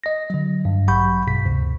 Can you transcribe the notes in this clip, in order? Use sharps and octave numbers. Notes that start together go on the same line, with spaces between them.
D#5 A#6
D3 F#3
G2
A1 F#3 F#5 B5 C#6 G6
A#1 G2 B2 B6
D2 C3